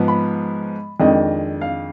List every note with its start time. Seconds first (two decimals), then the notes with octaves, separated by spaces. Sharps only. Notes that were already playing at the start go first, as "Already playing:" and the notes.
Already playing: G#2 F3 B3
0.08 B5
1.00 F2 D#3 G#3 D4 D#5
1.61 F5